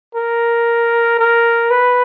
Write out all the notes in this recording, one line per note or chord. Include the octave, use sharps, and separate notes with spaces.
A#4
A#4
B4